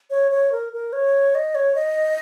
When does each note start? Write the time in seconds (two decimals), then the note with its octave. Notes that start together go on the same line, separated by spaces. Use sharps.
0.10 C#5
0.31 C#5
0.52 A#4
0.73 A#4
0.93 C#5
1.35 D#5
1.55 C#5
1.75 D#5